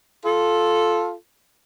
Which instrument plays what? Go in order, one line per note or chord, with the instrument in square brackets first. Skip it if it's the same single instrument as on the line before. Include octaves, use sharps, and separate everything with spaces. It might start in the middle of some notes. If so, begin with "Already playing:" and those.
[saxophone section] F4 A4